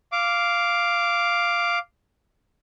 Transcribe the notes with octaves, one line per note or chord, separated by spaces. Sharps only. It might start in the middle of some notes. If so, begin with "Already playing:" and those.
F5 D6